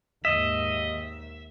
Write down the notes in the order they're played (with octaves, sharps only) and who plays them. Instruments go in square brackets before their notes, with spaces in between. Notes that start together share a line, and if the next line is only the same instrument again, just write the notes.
[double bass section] D#2 G#2 [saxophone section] D#5 [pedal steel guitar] E5